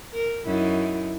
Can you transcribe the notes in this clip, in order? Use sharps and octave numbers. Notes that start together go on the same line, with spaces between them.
A#4
F#2 D#4 E4